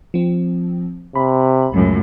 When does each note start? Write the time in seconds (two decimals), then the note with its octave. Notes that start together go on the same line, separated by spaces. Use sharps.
0.14 F3 C4
1.15 C3 B5
1.72 C#2 F#2 A2